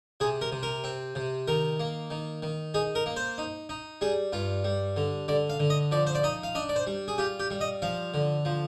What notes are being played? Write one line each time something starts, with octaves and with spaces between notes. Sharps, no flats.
C3 G#4
A#4
C3
A#4
C4
C3
D#3 A#4
A#3
D#3
D#3
D#4 G#4
A#4
A#3
C5
D#4
D#4
G3 G#4
G2 F4
G3
D3
D3 D5
F5
D3
D#5
F3 D5
C5
D5
D#4 D#5
F5
D4 D#5
D5
C5
G3
G#4
F4 G4
G4
G3
D#5
F3 F5
D3
F3